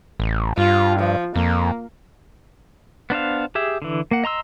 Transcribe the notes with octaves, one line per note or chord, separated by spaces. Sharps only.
A1
G2 F4
F3
F2 A#3
B3 D4 C5 F5
G4 G#4 E5
D3 E3
A#3 F#5
D#5 A#5 C6 E6